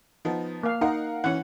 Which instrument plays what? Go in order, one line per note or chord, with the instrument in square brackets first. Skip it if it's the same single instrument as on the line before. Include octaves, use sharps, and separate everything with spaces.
[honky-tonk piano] F3 B3 D#4
[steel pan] A#3 F5
[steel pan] D#4 [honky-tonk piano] A#4 F5 F#5
[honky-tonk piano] E3 C#4 [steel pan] F#5